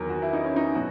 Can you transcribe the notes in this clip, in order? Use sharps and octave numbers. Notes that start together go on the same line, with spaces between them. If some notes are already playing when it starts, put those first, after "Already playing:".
Already playing: E2 D#3 F#3 A#4
F#4
E4
D#4
C#4
D#4
B2 F#3 F#4